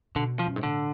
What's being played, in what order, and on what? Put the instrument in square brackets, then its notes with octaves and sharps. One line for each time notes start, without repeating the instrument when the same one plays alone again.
[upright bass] B2 [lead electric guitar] D3
[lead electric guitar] F3
[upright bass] F#2
G#2
[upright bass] A2 [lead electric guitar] D3